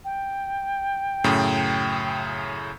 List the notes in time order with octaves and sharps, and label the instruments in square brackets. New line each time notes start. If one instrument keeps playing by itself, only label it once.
[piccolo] G5
[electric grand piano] F#2 A2 C#3